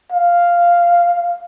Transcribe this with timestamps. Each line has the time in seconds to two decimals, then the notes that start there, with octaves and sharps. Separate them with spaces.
0.12 F5